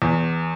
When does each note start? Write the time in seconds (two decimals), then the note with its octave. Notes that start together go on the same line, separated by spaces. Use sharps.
0.02 E2